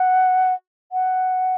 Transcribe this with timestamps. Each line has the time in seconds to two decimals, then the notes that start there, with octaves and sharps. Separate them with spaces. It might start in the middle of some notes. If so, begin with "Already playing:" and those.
Already playing: F#5
0.92 F#5